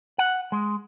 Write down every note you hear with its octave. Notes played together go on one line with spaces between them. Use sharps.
F#5
G#3